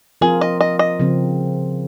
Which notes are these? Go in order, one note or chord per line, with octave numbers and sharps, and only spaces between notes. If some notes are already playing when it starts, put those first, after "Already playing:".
F3 C4 F4 G#4 A#4
D#5
D#5
D#5
C#3 F3 C4